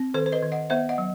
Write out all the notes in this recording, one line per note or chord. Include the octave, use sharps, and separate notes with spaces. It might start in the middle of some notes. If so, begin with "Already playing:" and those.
Already playing: C4
D#3 A4 C5
C5
B4 D#5
D#3
D#5 F#5
B3 C5 E5
D#5 F#5
F#3